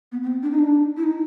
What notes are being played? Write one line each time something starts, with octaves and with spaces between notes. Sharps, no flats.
B3
B3
C4
D4
D#4
D4
E4
D#4